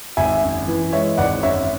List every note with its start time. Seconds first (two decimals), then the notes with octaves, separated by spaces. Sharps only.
0.17 G#1 E5 G#5
0.43 F#2
0.67 E3
0.93 G#3 C#5 E5
1.18 G#1 D5 F#5
1.43 F#2 C#5 E5